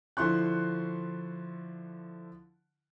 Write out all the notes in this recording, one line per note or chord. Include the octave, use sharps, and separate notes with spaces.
D3 F3 E4 C6 C#6 F#6